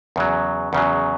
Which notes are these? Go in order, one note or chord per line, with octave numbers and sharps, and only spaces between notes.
E2 C#3 F#3
E2 C#3 F#3